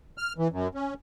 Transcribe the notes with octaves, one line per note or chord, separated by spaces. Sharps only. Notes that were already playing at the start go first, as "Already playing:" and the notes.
F6
E3
F#2
C#4